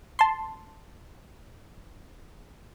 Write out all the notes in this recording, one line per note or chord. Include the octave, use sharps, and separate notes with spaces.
A5 C6